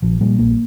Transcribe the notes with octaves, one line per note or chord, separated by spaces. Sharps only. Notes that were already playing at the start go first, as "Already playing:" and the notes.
A#1 F3
A#2 G3
A#1 A#3